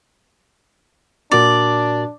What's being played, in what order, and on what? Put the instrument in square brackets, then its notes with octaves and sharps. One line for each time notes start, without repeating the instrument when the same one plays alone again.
[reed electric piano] A#2 F#4 A#4 [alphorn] D4 [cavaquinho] D5